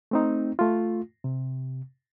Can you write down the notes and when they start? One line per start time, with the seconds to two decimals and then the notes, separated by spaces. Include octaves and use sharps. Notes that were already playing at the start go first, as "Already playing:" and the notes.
0.11 A3 C4 D#4
0.59 A3 F4
1.24 C3